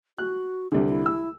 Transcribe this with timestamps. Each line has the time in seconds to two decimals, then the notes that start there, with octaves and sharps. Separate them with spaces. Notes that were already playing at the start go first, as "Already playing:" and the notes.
0.18 F#4 F#6
0.72 C2 D3 G4
0.89 E4
1.06 E6